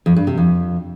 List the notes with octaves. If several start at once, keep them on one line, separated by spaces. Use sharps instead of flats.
F2
G2
C3
F2